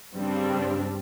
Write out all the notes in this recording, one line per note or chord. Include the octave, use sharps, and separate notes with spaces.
G2 C#3 G3 C4 D4